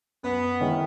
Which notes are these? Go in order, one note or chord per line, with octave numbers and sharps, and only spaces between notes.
F#2 B3
D#3 G#3 C#4 E4